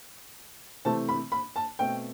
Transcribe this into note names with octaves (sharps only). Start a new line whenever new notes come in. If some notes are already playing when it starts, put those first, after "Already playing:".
C3 E3 A3 C4 A5
B5
B5
A5
B2 A3 C4 G5